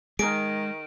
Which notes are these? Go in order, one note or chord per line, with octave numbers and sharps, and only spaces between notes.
D#3 G#3 G#4 A#4 D7